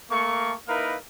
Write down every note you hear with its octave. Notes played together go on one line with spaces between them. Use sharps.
A3 A#3 C#6
A#3 D#4 E4 A#4 B4 F5